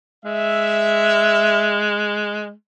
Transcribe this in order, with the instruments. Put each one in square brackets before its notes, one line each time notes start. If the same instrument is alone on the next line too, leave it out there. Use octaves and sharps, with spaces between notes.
[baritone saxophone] G#3 [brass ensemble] E5